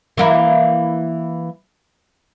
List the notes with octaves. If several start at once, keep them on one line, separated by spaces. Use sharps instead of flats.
E3 A#3 E4